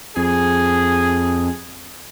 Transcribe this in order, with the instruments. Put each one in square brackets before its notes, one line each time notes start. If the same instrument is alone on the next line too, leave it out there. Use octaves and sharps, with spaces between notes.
[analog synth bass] F2 [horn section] G#4